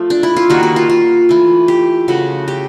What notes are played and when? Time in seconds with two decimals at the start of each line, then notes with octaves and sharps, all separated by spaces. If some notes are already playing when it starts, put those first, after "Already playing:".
Already playing: F3 A3
0.10 D4
0.23 E4
0.36 F4
0.50 D#3 G3 A#3 F#4
0.63 F#4
0.76 F4
0.89 F4
1.29 E3 A3
1.68 G4
2.08 C#3 F3 A3 F#4
2.48 G4